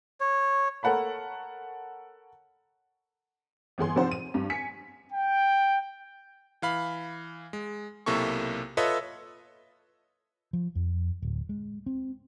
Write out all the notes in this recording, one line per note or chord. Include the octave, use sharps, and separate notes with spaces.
C#5
A4 A#4 C#5 F#5 A5 B5
G1 E3 G#4 C6
C3 F3 D#4 C5 F#5
D#7
G2
G#5 B6 C#7
G5
E3 F5 B5
G#3
B1 C3 A#3 E4 A4 C#6
F4 A4 B4 C#5 D#5 E5
F3
F2
D1
G#3
C4